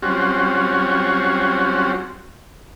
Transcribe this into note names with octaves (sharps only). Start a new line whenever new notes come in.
F#3 G3 C4 C#4 F4 F#4